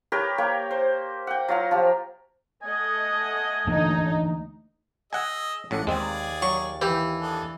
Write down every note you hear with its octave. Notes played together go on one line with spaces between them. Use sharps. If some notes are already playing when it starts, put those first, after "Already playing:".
G4 A#4 B4 C#5
A#3 C#5 G5
C5
F#5 G5
F#3 F4 A#5
F3 F4 G4
A3 D#5 F#5 G#5
D2 E3 A#3 D4 D#4
G#4 D#5 F#5 G#5 E6
A1 A2 D4 F#5
D#2 G#3 C4 G#4 D5 G#5
F#3 C#6
E3 G4 G5
D4 G#4 A4